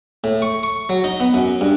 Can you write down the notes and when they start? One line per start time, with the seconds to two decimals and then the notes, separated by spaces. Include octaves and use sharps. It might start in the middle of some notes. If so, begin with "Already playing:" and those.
0.24 A2
0.42 C#6
0.63 C#6
0.89 F#3
1.04 D#4
1.20 B3
1.34 F#2
1.61 G2